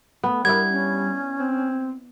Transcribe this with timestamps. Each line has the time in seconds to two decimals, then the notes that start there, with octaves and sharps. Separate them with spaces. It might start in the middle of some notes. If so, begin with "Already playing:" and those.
0.23 A3 B3
0.45 G3 B3 D4 E4 A#4 G#6
0.71 C#4
1.39 C4